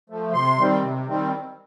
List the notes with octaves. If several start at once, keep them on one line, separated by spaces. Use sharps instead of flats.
F3 A3
C3 C6
D#3 G3 C4
C3
D#3 G3 C4